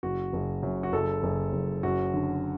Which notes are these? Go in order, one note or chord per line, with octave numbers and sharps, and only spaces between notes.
F#1 F#4
F#1
F#2
F#4
F#1 A4
F#1
F#1
F#2 F#4
D3